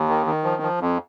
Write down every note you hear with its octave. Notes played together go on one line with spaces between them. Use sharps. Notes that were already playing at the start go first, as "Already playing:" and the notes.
Already playing: D#2
D#3
D#3
F3
F3
F2